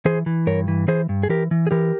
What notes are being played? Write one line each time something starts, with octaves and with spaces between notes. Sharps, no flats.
E3 G#4 C5
E3
G2 A#4 C#5
E3
E3 G#4 C5
G2
G#4
E3 G4 A#4
E3
G#4
E3 G4 A#4